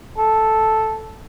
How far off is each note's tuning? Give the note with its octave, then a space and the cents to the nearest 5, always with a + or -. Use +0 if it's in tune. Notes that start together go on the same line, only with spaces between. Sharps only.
A4 -5